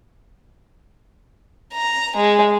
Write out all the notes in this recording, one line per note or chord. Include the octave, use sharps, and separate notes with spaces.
A#5
G#3